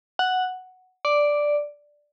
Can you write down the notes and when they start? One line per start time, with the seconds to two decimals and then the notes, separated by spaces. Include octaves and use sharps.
0.19 F#5
1.05 D5